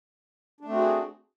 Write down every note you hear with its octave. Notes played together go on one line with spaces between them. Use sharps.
A3 C4 D4 F#4 G#4